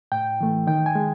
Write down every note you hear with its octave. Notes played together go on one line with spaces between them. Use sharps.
A2 G5
E3 A3
D#3 G5
G#5
G#3